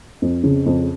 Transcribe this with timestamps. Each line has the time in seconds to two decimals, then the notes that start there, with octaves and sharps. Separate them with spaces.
0.22 F2
0.43 C#3
0.66 F2